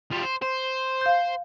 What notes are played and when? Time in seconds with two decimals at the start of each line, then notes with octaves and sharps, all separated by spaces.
0.11 F3 G3
0.22 C5
0.42 C5
1.01 F5 G6